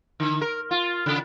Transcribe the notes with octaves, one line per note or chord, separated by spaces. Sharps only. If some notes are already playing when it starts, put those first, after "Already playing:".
D3
A#4
F4
C#3